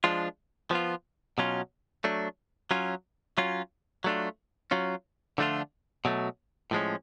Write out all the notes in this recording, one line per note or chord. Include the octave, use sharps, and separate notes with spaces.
F3 G#3 D4 F4
F3 B3 F4
B2 F#3 C#4 F4
F#3 A3 D4
F#3 C#4 F4
F#3 C#4 F4
F#3 A3 D4 F4
F#3 C#4 F4
D3 F3 A3 D4 F4
B2 F#3 A3
A2 F3 G#3 C#4